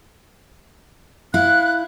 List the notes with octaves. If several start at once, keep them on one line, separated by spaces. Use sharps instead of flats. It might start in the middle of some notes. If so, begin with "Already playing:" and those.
E4 F5 F#6